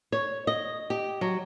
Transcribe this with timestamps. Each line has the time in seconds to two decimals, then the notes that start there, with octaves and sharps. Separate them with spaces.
0.12 C#5
0.47 D#5
0.90 G4
1.21 F#3